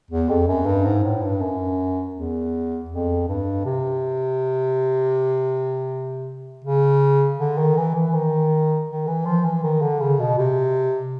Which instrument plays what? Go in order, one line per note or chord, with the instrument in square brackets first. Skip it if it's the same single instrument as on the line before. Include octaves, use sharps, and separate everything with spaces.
[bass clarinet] E2
F2
F#2
G2
G#2
A2
G2
F#2
E2
F2
G2
C3
C#3
D3
D#3
E3
E3
D#3
D#3
E3
F3
E3
D#3
D3
C#3
B2
C3